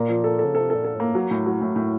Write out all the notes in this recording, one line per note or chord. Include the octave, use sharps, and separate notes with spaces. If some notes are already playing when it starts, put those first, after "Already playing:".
Already playing: A#2 A#3
F3
A4
A4
C#3
C3 A4
A#2 A4
A4
A2 A#3
F#3
A2
F#3
A2
A2